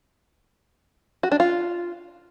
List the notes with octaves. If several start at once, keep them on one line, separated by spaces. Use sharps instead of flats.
F#4
D4
F4